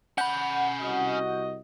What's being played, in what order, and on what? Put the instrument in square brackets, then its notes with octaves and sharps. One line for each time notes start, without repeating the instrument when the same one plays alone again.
[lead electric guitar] C#4 B5 [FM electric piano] F#5 G6
[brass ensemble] C2 F#4 D#5